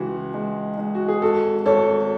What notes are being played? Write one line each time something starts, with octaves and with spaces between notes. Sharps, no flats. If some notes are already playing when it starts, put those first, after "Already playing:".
Already playing: C#2 E3 F#4
G#3
G#3
F#4
G#4
G#1 F#4 A4
G#1 A4 C#5